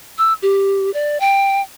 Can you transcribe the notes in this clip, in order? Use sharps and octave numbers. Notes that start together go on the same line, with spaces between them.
E6
G4
D5
G5